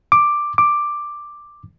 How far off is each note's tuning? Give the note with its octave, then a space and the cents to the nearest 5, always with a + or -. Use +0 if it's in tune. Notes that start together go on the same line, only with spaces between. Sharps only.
D6 +5
D6 +5